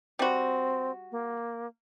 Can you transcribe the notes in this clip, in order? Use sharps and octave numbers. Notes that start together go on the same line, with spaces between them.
G3 C4 F#4
A#3